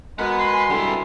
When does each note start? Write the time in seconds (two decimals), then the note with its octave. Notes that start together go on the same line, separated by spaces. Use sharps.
0.19 G#3 F#4 A#4 B4 F#5
0.39 B4 C6
0.53 G#5
0.70 D3 G3 E4 B4